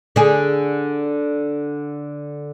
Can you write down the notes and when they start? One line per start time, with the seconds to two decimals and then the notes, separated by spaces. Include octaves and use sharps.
0.16 D3 G#4